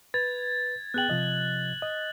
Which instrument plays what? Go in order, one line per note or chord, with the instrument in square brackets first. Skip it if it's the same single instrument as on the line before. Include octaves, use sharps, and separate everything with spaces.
[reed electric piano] B4 [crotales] G#6 A6
[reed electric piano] B3 G#4 G5 [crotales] F#6 F#7
[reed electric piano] C3 F3 D#5
D#5